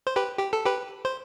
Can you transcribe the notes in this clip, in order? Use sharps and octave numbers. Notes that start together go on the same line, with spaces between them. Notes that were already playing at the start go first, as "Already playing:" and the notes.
C5
G4 B4
G4
A4
G4 B4
C5